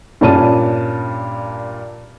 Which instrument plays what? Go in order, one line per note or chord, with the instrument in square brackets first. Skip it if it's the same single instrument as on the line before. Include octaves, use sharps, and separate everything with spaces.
[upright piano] G2 A#2 C#4 A5 D#7